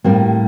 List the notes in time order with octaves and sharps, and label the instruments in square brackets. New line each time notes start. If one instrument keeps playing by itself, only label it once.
[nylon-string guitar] A2 G3 A#3 C4